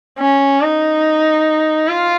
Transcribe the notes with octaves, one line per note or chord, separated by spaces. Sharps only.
C#4
D#4
F4